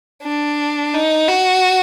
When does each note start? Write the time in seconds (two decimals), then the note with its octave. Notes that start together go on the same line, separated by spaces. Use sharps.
0.23 D4
0.94 D#4
1.29 F#4